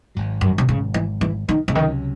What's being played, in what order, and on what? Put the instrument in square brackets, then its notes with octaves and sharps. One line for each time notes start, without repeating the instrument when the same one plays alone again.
[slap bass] G#1 G#2 F#3
[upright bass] F#2
C3
C#3
E3
E3
D#3
C#3
[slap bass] C#2 C3 F#3 C#4 [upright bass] D#3